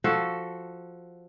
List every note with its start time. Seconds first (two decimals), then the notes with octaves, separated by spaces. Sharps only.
0.04 F3 F#4 A4